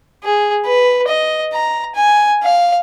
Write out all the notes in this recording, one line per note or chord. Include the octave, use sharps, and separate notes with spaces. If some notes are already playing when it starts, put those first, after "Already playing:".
G#4
B4
D#5
A#5
G#5
F5